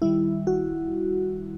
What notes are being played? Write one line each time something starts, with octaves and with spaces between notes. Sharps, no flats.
D#3 G3 E4
F#4